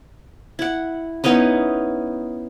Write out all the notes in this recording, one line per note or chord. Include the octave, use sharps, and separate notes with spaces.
E4 F#5
B3 C#4 D#4 E4